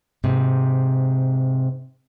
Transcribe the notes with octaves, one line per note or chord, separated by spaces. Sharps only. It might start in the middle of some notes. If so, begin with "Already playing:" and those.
G#2 C3